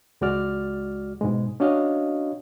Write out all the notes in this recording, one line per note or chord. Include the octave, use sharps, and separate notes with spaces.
C#2 G#3 F#4 D5 F6
G#2 B2 G#3
C#4 D4 F#4 C#5 D#5 F5